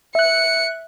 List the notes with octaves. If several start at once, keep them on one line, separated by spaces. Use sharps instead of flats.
E5 F#6 C#7